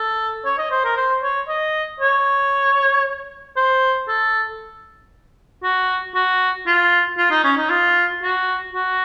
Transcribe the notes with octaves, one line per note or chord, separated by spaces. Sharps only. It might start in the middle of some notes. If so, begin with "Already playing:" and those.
Already playing: A4
C#5
D#5
C5
A#4
C5
C#5
D#5
C#5
C5
A4
F#4
F#4
F4
F4
D#4
C#4
D#4
F4
F#4
F#4